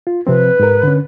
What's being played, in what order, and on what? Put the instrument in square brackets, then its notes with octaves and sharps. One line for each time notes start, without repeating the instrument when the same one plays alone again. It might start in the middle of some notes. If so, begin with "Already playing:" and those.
[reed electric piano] F4
[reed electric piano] C3 F3 C4 [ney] B4
[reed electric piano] G#2 A#4
D3 C#4